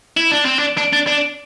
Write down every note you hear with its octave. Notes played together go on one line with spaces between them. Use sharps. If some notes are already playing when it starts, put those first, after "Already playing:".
E4
D4
C4
D4
D4
D4
D4